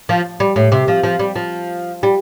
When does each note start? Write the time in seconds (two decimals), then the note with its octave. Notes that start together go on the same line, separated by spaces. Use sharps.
0.09 F3
0.40 G3
0.56 A2
0.72 C3
0.88 F3
1.03 F3
1.19 G3
1.36 F3
2.03 G3